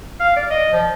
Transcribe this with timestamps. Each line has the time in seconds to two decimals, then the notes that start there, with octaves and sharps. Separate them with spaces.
0.20 F5
0.37 D5
0.51 D#5
0.72 F3